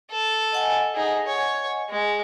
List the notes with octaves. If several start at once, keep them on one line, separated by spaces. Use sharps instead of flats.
A4
D#5 F#5 G#5
D#4 G#4
C#5
G#3